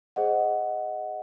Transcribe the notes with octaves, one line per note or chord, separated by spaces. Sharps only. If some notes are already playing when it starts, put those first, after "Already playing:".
G#4 C5 D#5 F#5